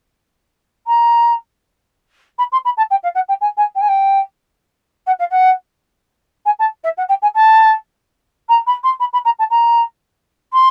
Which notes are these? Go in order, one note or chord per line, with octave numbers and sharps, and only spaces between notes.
A#5
B5
C6
B5
A5
G5
F5
F#5
G5
G#5
G#5
G5
G#5
G5
F#5
F5
F#5
G#5
A5
E5
F#5
G5
G#5
A5
A#5
B5
C6
B5
B5
A#5
A5
A#5
C6